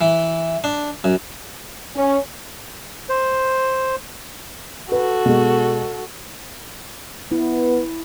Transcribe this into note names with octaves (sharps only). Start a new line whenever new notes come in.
E3
D4
F#2
C#4
C5
F#4 A4 B4
B2 G#3
B3 E4